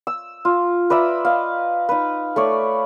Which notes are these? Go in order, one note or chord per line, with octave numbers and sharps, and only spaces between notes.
E6
F4
B4 D5 E5 A#5
D#5 F5
D#4 B4
A3 C#5 D5